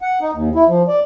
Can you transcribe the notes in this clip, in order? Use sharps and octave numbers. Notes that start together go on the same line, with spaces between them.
F#5
D#4
D#2
E4
F3
D5